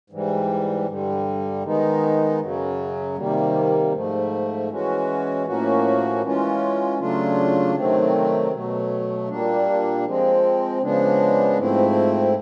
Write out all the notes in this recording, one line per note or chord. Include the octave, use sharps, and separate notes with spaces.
G#2 E3 G3
G2 D3 G3
D#3 G#3 B3 D#4
F#2 C#3 F#3
C3 D#3 G3 A#3
G#2 F3 A3
E3 G#3 C#4 F#4
A2 F3 A#3 C#4 F#4
E3 G#3 C#4 F4
C#3 F#3 A3 D4 F4
C3 D#3 F#3 A3 C4
B2 F#3 A3
A#2 G3 A#3 D4
F3 G#3 C4
C#3 F3 G#3 B3 D4
G#2 F3 A3 C4 E4